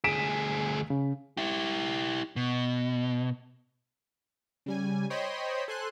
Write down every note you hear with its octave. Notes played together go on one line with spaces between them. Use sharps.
D2 G#4 B6 D7 E7
C#3
E4 G4
B2
C#3 G3 G#5
C5 C#5 D#5 G5 B5 C6
A4 C5 G#5 C6 F#6